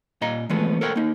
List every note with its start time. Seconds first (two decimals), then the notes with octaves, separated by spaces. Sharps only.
0.21 A#2 D#5 A#5
0.50 E3 F3 G#3 A3 B3
0.81 A4 A#4 C#5 F#5 G5
0.96 A#3 D#4